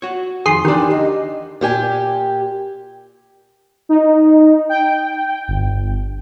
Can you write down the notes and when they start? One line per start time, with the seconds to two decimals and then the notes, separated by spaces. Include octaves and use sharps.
0.02 F#4 C#5
0.46 F2 D#3 G#4 C6
0.65 D#3 E3 D4 G4
0.92 D2 D#5
1.61 A#2 G4 G#5
3.89 D#4
4.69 G5
5.48 G1